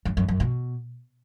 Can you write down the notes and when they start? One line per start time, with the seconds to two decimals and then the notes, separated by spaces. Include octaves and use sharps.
0.05 F#2
0.17 F#2
0.28 F#2
0.40 B2